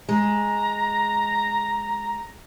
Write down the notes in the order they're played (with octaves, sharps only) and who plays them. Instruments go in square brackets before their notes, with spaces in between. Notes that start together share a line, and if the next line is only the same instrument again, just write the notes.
[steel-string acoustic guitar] G#3 [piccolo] A#5